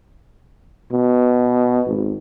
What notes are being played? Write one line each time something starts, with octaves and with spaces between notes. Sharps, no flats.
B2
G#1